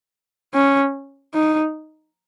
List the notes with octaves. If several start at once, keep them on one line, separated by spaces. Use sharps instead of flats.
C#4
D#4